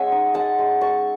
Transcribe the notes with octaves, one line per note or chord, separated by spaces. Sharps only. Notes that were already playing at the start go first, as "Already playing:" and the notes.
Already playing: G#3 C#4 E5 F#5 G#5
D#4
G#3 F#5 A5
G#3
G#3 A5 C#6